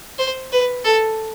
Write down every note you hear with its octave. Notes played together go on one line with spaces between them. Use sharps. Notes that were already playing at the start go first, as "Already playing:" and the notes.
C5
B4
A4